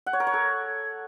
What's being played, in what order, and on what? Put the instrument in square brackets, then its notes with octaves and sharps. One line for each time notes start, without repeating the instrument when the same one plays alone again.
[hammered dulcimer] F#5
C#5
A#4
C#5
A4